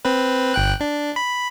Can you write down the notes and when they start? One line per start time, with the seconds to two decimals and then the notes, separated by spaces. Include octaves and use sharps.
0.05 C4 B4
0.54 G1 G5 F#6
0.81 D4
1.16 B5